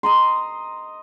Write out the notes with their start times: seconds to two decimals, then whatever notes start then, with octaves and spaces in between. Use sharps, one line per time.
0.03 D#5 A#5 C6